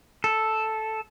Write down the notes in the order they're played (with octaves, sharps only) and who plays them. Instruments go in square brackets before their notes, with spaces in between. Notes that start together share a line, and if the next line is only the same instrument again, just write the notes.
[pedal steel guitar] A4